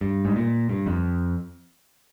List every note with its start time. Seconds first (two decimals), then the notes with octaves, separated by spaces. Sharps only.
0.01 G2
0.25 G#2
0.36 A#2
0.69 G2
0.86 F2